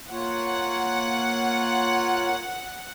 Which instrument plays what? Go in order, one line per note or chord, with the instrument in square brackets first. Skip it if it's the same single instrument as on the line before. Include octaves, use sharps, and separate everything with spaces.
[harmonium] A#3 F4 C#5 [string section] F#5